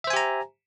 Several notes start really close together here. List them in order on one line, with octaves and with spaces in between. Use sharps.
E5 C5 G#5 G4 A#5